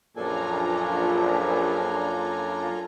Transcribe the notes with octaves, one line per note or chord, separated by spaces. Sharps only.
A#1 F#2 A#3 D4 F4 A4 G#5 A#5